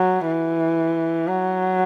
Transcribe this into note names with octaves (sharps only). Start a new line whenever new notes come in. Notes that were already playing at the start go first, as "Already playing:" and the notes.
Already playing: F#3
E3
F#3